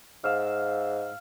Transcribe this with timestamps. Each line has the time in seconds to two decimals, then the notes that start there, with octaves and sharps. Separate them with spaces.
0.24 G#2 F5 E6